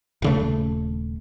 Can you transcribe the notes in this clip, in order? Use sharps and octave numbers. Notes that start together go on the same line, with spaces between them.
D#1 C#3 A3